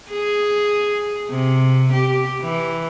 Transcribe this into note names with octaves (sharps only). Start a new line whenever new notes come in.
G#4
C3
G4
E3